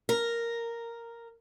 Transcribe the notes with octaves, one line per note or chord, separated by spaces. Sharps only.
A#4